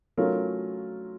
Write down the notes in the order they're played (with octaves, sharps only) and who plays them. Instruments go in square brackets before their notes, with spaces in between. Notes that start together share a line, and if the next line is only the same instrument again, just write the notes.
[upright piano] F#3 A3 C#4 F4 A#4